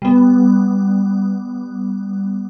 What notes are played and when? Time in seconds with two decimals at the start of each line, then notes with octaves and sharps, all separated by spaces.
0.02 G3 B3